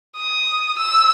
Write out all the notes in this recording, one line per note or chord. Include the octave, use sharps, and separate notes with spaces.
D#6
E6